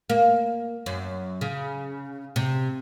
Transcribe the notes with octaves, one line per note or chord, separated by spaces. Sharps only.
A#3
F#2
C#3
C3